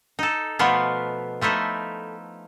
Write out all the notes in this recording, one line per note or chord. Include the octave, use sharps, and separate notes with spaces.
D#4 A4
B2 F3 A3 B3 F4
F3 A3 D#4 E4